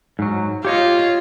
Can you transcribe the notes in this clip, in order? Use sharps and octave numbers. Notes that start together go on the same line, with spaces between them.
G#2 F#3
F4 G4 C#5 D#5